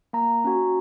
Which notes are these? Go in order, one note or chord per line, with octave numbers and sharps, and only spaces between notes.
A#3 A#5
C#4 F#4